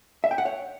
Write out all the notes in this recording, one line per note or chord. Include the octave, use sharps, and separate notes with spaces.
E5
G5
F#5
C#5